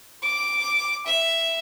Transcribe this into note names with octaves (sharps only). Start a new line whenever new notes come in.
D6
E5